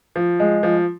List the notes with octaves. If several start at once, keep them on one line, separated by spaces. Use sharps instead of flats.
F3
G#3
F3